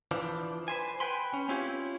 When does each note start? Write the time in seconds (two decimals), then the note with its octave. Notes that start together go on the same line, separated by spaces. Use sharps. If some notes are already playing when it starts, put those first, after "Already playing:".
0.11 E3 F3 D4
0.68 B4 C5 G#5
1.00 B4 G5 G#5 B5 C6
1.33 C#4
1.49 C4 C#4 E4 F4 G4 C#5